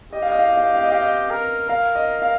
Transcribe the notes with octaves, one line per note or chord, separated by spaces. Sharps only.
G4 D#5
F5
D#5
F5
D#5
F5
D#5
F5
D#5
G4 F5
D#5
A#4
A#4 F5
D#5
F5